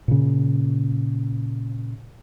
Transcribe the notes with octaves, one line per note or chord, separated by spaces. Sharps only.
A#2 C#3